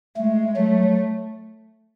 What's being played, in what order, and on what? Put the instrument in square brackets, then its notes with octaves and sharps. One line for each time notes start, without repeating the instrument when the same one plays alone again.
[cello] G#3 [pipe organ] A3
[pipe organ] F#3 [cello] A3